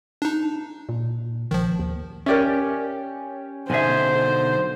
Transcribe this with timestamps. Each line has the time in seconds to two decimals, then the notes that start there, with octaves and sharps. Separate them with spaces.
0.22 D4 D#4
0.89 A#2
1.51 A#1 D#3 F3
1.79 D#2
2.26 C#4 G4 A#4 D5 E5
3.70 B1 D3 G#4 C5 E5 G#5